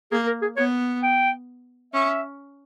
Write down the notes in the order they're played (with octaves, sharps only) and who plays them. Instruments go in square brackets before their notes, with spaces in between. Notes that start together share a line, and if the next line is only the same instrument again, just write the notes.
[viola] A#3 [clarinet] G#4
[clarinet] A#4
G#4
[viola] B3 [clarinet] C#5
[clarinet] G5
[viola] C#4 [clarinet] E5